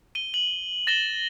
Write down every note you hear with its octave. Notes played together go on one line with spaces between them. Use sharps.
D#7 G7
F#7
A6 A#6 E7 F#7 G7